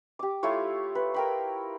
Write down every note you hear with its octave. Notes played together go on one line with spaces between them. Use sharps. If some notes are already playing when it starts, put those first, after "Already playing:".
G4 D6
A3 E4 F4 C#5
B4
A#4 G5 B5